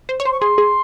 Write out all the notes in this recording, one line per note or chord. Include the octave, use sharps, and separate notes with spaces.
C5
C#5
C5 C6
C#6
G#4 C6
G#4